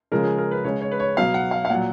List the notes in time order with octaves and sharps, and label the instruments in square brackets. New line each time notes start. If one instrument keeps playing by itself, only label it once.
[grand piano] C#3 F3 G#3 A#4
G#4
A#4
B4
C#3 G#3 C#5
C#5
B4
C#5
B2 F#3 F5
F#5
F5
F5
A#2 F#3 F#5